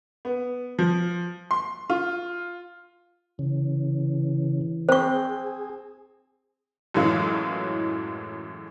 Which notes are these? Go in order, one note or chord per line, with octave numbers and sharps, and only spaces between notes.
B3
F3
C6
F4
C#3 E3
C4 G#4 C5 C#6
F#2 A2 E3 F#3 G#3 F4